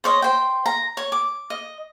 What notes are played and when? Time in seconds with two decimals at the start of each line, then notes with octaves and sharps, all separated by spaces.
0.04 C5 C#5 D#5
0.22 C5 G5
0.66 A#5
0.97 C#5
1.12 D6
1.50 D#5